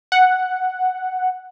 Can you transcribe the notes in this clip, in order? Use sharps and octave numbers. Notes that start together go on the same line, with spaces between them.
F#5